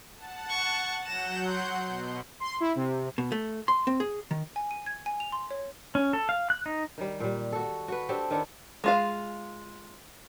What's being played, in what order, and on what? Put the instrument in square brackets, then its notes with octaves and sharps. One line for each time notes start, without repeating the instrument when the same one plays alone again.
[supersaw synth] F#5 A5
[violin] C#6
[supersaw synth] F#3 F#5 G6 [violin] A#6 E7
[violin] C6
[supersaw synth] B2
[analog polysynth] C6
E4
C3
[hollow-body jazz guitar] B2
A3
C6
C4
G#4
D#3
[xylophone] G#5
D#7
G#6
G#5
F7
C6
C#5
[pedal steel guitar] C#4
A4
F5
F#6
D#4
[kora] D#3 G3
A#2 G3
F#4 A4
F#4 B4
C4 D4 G4 A4
D#3 D4 E4 F#5
[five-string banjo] G#3 F4 F5